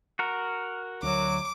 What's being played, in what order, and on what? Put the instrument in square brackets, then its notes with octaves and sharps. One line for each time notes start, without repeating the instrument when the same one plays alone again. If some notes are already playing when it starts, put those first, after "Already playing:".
[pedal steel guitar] F#4 A#4
[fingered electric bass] D2 [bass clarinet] F#3 [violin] D6